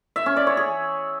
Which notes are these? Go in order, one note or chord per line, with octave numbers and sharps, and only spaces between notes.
E5
C#4
D5
C#5
G#4